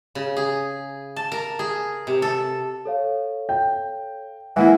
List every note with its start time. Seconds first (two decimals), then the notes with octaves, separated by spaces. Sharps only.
0.15 C#3
0.37 G#4
1.16 A5
1.32 A#4
1.59 G#4
2.07 C3
2.22 A4
2.85 A4 C#5 F5
3.49 G5
4.56 E3 G#3 A#3 E4 F#5